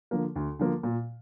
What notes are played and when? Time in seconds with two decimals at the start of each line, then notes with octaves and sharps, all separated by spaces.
0.11 D3 F3 A#3
0.36 D2
0.59 D3 F3 A#3
0.83 A#2